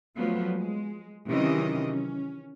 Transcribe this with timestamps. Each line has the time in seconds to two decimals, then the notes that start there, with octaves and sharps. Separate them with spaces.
0.16 F3 F#3 A3 B3
0.55 G#3
1.28 C3 D#3 E3 F#3 C#4 D#5
1.86 C#4